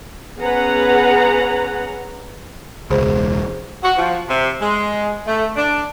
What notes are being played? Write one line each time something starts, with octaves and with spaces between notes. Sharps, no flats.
B3 C#4 G#4 B4 F#5 A#5
E1 C#2 G#4 C5
F#4
F3
C3
G#3
A3
D4